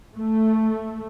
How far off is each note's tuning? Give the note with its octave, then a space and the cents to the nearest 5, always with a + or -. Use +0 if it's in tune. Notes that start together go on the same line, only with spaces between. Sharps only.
A3 +0